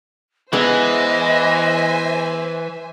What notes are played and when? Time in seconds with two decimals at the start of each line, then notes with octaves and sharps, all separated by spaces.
0.53 E3 G#3 B3 C5 D#5 E5 G#5